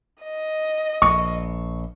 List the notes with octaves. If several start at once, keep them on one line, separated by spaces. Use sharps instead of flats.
D#5
A#1 C#6